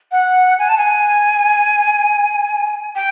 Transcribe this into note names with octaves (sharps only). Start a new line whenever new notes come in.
F#5
G#5
A5
G#5
G5